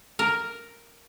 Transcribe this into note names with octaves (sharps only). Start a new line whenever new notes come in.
A#4